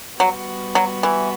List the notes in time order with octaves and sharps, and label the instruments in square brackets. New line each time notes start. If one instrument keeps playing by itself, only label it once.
[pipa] F#3 [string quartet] G3 B3 F#4
[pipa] F#3
E3